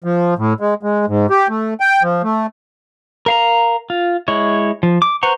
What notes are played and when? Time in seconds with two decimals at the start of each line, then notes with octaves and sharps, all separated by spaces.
0.04 F3
0.38 A2
0.60 G#3
0.83 G#3
1.08 G#2
1.30 G4
1.49 A3
1.80 G5
2.03 F3
2.23 A3
3.26 A#4 F5 A#5
3.90 F4
4.28 G#3 E4 C#5
4.83 F3
5.02 D6
5.23 B4 C5 F#5 A#5 C#6